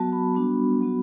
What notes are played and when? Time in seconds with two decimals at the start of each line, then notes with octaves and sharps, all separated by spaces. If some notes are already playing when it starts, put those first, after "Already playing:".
Already playing: F#3 B3 F#4 A5
0.12 B5
0.35 G3 B3 D4 F#4 B5
0.81 F#3 B3 F#4